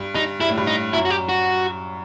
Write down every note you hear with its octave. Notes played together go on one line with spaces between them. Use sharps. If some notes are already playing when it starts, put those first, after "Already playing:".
Already playing: G2
G2 D#4
G2 E4
A2
G2
D#4
F#2 E4
F#4
G4
F#4